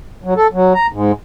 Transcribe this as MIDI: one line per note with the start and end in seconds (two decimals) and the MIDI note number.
0.24 0.34 54
0.37 0.47 69
0.53 0.73 54
0.74 0.87 82
0.92 1.12 44